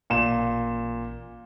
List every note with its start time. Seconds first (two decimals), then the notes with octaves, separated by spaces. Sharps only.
0.10 A1 A#2 E7